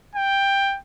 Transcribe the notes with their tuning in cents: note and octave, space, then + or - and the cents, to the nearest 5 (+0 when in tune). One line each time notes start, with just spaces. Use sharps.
G5 +10